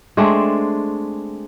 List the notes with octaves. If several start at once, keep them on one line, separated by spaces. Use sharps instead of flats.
G#3 A3 C4 D4